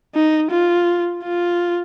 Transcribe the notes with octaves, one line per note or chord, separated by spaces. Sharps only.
D#4
F4
F4